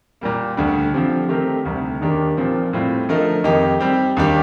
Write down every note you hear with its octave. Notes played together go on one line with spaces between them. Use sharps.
A#2 G3 A#3
D2 D3 G3
D3 F3 C4 G4
D#3 A3 C4 G4 A#4
D2 C3 G3
D#2 D#3 A#3 D4 G4
A#2 F3 C4
A2 G3 C4 F4
D3 F3 A3 D#4 A#4
F2 D#3 A#3 D#4 G4
G3 C4 G4
D#2 D#3 G3 D4 G4